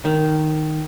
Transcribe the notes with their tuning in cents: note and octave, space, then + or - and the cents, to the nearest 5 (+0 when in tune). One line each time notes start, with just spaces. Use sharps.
D#3 -5